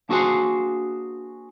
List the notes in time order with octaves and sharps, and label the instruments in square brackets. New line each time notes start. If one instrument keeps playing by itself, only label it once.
[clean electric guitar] A#3 D4 F#4 G#4 C5 F#5